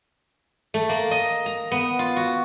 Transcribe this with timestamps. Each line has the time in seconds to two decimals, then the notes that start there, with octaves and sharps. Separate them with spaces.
0.74 A3
0.89 A#3
1.11 D#5
1.46 A#5
1.72 B3
1.99 F4
2.17 F#4